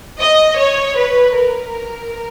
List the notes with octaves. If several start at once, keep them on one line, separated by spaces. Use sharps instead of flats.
D#5
C#5
B4
A#4